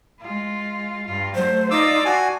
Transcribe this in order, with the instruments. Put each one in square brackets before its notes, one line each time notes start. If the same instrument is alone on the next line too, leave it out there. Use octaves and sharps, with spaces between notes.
[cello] G#3 F4
G2 F4
[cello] F#3 A3 [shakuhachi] C5
[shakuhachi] D#4 [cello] F4 D5 [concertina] D6 E6
[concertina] F#4 G#5 [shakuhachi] A5